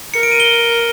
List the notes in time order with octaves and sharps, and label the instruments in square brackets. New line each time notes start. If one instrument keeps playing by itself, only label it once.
[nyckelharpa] A#4 [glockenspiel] C#7
[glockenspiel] D7
D#7
G7